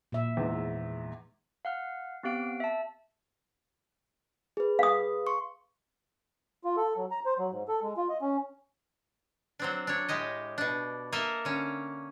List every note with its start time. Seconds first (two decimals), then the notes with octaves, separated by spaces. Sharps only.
0.12 A#2 E5
0.37 E2 G#2
1.65 F5 F#5 F6
2.23 B3 C4 G4 F5 D7
2.60 E5 A5
4.57 G#4 B4
4.79 F5 D#6
5.26 C6 C#6
6.64 F4
6.77 A4
6.97 F#3
7.11 A#5
7.25 C5
7.39 F#3
7.51 G#2
7.68 A4
7.82 G#3
7.97 F4
8.09 D#5
8.22 C#4
9.59 F#3 C4 D4
9.87 D4 C#5
10.09 A2 G#3 G4 D#5
10.58 B2 D4
11.12 A#3 A4 A#4 D#5 E5
11.45 D3 C#4